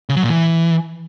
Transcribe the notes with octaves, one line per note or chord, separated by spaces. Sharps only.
C#3
F#3
A#2
E3